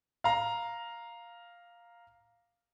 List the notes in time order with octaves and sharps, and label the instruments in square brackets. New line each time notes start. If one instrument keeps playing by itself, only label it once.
[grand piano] F5 A#5